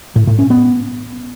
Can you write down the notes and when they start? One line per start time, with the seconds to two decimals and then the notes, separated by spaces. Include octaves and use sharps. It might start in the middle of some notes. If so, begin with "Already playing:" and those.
0.16 A2
0.27 A2
0.39 C#4
0.50 B3